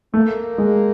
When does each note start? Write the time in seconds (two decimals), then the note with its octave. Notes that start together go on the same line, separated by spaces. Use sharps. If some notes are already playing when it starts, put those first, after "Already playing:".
0.14 A3 A#3
0.58 G#3